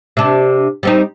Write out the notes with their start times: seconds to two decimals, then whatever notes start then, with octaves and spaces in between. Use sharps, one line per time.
0.17 C3 D4
0.83 G3 C4 D#4